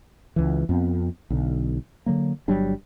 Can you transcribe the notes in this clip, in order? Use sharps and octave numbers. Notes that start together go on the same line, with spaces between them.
C#2 E3
F2 B3 C4
B1 D3
D3 F#3 A#3
G1 F#3 G3 D4